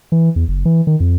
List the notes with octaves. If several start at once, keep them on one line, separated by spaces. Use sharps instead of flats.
E3
E2
F#1
E3
D#3
F2